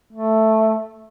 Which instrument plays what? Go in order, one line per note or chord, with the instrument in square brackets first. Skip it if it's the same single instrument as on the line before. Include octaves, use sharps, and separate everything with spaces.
[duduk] A3